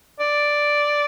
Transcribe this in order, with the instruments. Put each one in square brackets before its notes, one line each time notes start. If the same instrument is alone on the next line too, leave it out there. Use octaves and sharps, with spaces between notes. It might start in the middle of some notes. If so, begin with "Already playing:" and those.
[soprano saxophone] D5